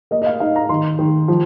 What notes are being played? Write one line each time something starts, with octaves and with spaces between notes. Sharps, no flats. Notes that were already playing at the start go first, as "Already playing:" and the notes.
A#3 D#5
D#5
F5
D#4 F5
A#5
D#3 C6
D#3
F3